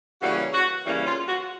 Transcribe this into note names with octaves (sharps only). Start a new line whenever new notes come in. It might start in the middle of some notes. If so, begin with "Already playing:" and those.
C#3 E3 G3 A#3 C#4 F#4
F#4
C#3 E3 G3 A#3 C#4 E4
F4
F#4